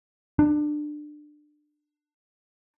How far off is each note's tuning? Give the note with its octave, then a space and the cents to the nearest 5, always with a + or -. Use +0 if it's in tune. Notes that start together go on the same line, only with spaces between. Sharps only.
D4 +25